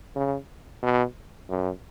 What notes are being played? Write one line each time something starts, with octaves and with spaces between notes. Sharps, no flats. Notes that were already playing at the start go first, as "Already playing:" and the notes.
C#3
B2
F#2